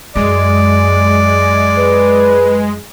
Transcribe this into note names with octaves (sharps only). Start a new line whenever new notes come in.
F#2 G#3 D5
B4